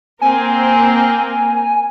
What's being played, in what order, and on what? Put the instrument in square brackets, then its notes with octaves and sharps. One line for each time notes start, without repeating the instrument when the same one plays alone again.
[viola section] A#3 C4 A#4 [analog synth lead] G#5